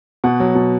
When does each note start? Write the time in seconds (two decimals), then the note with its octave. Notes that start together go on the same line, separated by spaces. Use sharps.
0.24 B2 F#5
0.40 F#3
0.55 B2